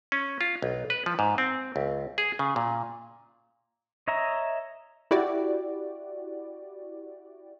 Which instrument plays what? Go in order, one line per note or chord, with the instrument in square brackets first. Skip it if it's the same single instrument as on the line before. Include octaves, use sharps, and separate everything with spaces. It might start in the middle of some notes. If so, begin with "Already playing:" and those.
[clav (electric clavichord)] C#4
F4
B1
B4
F3
G#2
C4
C#2
G#4
C#3
A#2
[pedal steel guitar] C#5 D#5 E5 A#5
[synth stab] E4 F#4 G4 D5